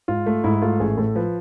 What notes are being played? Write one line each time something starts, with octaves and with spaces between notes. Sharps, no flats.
G#2 F4
A3
G#2 E4
A3 F4
A1 G#4
A2 A4
F3 B4